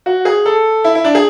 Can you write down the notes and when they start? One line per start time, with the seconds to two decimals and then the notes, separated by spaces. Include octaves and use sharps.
0.06 F#4
0.25 G#4
0.46 A4
0.84 E4
0.95 E4
1.04 D4
1.15 G#4